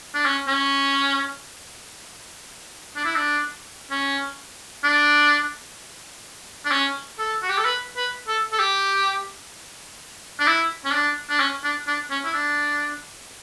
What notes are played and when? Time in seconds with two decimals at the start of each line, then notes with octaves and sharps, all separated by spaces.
0.14 D4
0.26 C#4
0.47 C#4
2.96 D4
3.05 E4
3.15 D4
3.91 C#4
4.84 D4
6.65 D4
6.71 C#4
7.19 A4
7.42 F#4
7.49 G4
7.58 A4
7.65 B4
7.96 B4
8.28 A4
8.52 A4
8.59 G4
10.40 D4
10.47 E4
10.85 C#4
10.93 D4
11.30 D4
11.40 C#4
11.64 D4
11.87 D4
12.11 C#4
12.25 E4
12.34 D4